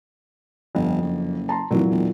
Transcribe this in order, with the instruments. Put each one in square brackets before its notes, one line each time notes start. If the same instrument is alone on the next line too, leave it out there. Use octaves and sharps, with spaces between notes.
[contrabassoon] G1 [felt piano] F2
[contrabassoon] F#1
[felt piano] A5 A#5 C6
[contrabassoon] F1 [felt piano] A#2 E3 F#3
[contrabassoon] E1